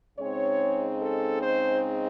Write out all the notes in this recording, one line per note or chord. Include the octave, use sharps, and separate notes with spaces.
C#3 G#3 C4 D#4 C#5
A4
C5